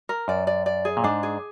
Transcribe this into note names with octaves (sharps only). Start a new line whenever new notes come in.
A#4
F#2 D5
D5
D5
G#4
A#2
G#2 D4
G#4